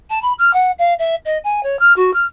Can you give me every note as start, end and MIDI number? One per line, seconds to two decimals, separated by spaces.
0.10 0.21 81
0.22 0.33 83
0.38 0.51 89
0.53 0.71 78
0.78 0.94 77
0.99 1.15 76
1.25 1.38 75
1.44 1.63 80
1.63 1.79 73
1.79 1.93 89
1.96 2.11 66
2.13 2.25 89